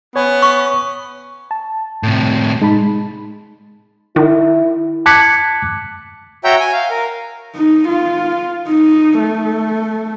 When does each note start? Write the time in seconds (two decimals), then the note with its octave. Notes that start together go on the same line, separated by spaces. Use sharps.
0.16 B3 C#5 G#5
0.42 C#6
1.51 A5
2.03 A2 C3
2.62 G#3 D#4 A5 B5
4.16 D#3 E4
5.06 A5 D6 F#6 G#6 B6 C#7
6.44 F#4 C#5 E5 G5 A#5 G6
6.60 G#5
6.73 F5
6.90 A#4
7.56 D#4
7.88 F4
8.67 D#4
9.19 A3